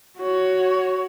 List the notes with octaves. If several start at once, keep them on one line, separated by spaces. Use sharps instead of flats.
F#4 C#5